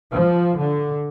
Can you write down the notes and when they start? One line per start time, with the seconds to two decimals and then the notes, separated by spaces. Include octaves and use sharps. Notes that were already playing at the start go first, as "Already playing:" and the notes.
0.12 F3
0.59 D3